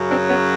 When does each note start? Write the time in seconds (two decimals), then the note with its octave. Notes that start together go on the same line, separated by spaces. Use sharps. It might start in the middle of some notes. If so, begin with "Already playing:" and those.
Already playing: F#2 C#3 F#3
0.10 C4 D4
0.28 B3 C#4